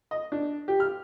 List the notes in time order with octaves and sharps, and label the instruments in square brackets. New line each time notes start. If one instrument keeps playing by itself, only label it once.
[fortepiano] D#5
D4
G4
F6